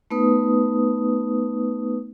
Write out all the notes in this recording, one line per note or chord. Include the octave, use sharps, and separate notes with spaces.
A3 B3 D#4 B4 D#6